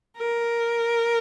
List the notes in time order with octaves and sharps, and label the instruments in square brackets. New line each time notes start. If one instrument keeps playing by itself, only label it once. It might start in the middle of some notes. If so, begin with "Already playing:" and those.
[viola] A#4